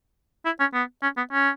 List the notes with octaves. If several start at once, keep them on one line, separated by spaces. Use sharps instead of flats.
E4
C#4
B3
C#4
B3
C#4